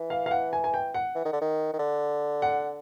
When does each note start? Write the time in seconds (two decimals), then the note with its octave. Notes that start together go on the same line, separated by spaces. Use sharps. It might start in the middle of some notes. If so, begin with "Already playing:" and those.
Already playing: E3
0.10 F5
0.26 F5
0.31 F#5
0.53 G#5
0.64 G#5
0.74 G5
0.94 F#5
1.15 E3
1.25 D#3
1.33 D3
1.41 D#3
1.73 D#3
1.79 D3
2.42 F#5